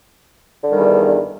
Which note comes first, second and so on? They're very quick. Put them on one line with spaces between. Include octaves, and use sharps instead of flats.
D3 G3 D#3 G2 E2